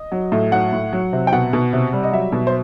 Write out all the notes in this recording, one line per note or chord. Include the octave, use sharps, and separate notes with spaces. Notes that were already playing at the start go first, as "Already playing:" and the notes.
Already playing: D#5
F#3
A2
F#3 F#5
A2
F#3
C3
G5
B2 F#5
B2
C3
G3
D#5
F#3 E5
B2
C5